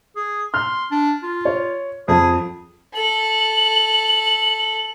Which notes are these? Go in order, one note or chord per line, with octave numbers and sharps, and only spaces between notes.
G#4
C6 F6
D4
F4
C#5
F2 G#4
A4 F#7